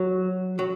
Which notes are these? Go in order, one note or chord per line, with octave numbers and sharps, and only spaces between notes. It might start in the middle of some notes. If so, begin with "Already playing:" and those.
Already playing: F#3
F#3